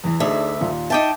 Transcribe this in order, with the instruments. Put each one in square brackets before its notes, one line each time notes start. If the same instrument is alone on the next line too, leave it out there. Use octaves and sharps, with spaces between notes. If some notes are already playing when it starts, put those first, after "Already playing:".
[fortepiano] E2 E3
[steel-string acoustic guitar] D2 E5 [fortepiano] D4 D#4 G#4
[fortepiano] D#2 A#2
[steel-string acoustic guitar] D#4 G5 A5 [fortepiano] E5 D6